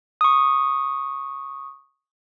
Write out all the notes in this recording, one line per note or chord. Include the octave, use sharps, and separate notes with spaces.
C#6 D#6